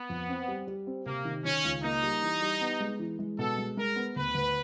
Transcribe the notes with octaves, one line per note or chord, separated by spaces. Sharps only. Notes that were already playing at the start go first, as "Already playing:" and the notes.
Already playing: B3
F2
C4
G3
G3
C4
C3 A#3
D#3
D#3 C#4
C#2
A#3 D#4
G3
E3
G3
B3
G#3
E3
G#3
B2 A4
G#3
G#3 A#4
B3
D2 B4
D2